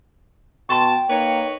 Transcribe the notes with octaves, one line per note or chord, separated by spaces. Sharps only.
B2 G5 A5 C6 C#6
A#3 D#4 B4 C#5